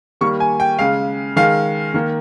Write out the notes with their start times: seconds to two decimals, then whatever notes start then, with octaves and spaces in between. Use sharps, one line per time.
0.21 D#3 G3 A#3 C#6
0.40 G#5
0.60 G5
0.79 C#3 G#3 F5
1.36 D#3 G#3 F5
1.94 D#3 A#3